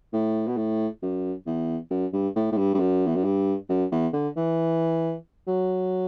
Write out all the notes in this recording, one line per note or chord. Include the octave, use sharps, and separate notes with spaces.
A2
B2
A2
F#2
E2
F#2
G2
A2
A2
G2
G2
F#2
E2
F#2
G2
F#2
E2
D3
E3
F#3